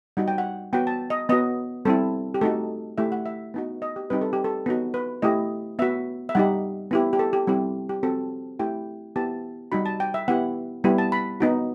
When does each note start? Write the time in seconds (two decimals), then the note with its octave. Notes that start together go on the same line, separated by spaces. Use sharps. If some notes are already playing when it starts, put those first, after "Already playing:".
0.17 G3 D#4 F#4 F#5
0.28 G5
0.38 F#5
0.73 B3 F#4 G5
0.87 A5
1.10 D#5
1.29 B3 F#4 D#5
1.85 G3 C4 E4 A4
2.34 G4
2.41 A3 D#4 F#4 A4
2.98 A3 E4 G4 E5
3.12 F#5
3.26 E5
3.54 B3 D#4 F#4
3.82 D#5
3.96 G4
4.10 G3 C4 D#4 G4 B4
4.21 A4
4.33 G4
4.44 A4
4.66 B3 D#4 F#4
4.94 B4
5.22 A3 E4 G4 D#5
5.79 B3 F#4 E5
6.29 E5
6.35 G3 D#4 G4 F#5
6.91 B3 E4 G4
7.13 G4
7.19 A4
7.33 G4
7.47 G3 C4 E4 G4
7.89 G4
8.03 C4 F#4 A4
8.59 A3 E4 G4 G5
9.16 B3 E4 G4 A5
9.72 G3 D#4 F#4 B5
9.86 A5
10.00 G5
10.14 E5
10.28 B3 E4 G4 F#5
10.84 G3 B3 E4 G4
10.98 A5
11.12 B5
11.40 B3 D#4 F#4